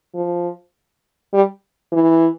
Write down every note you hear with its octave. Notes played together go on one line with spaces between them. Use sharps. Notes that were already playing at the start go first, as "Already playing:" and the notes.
F3
G3
E3